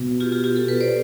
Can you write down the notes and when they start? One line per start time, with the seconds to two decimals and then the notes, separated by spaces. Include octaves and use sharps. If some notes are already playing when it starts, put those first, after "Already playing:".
Already playing: B2
0.20 F4 G4
0.32 F4 G4
0.44 F4 G4
0.56 G4 A4
0.68 A4 B4
0.81 C5 D5